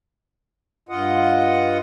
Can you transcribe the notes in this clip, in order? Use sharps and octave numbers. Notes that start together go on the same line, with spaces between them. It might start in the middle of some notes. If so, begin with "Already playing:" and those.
G2 F4 D#5 F#5